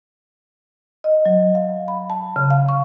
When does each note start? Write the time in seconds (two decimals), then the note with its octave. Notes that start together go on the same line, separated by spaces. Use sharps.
1.04 D#5
1.26 F#3
1.55 F5
1.88 B5
2.10 A5
2.36 C#3
2.50 F5
2.69 C#6